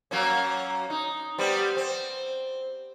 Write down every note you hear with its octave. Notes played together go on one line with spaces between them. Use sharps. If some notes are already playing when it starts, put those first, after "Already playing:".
F#3 A#3 C#4
D#4
G3 B3 C4
C4